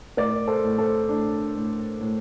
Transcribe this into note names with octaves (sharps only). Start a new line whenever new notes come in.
A2 A#4 D5
A4 C5
A2
A4 C5
A2 D4
A2
A2